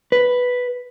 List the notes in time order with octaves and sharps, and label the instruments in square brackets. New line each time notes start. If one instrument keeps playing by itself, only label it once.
[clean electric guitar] B4